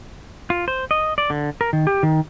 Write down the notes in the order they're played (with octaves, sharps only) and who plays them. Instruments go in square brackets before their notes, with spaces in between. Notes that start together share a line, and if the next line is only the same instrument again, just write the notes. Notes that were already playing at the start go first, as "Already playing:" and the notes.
[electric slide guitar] F4
C5
D#5
D5
D3
A#4
D#3
G4
D#3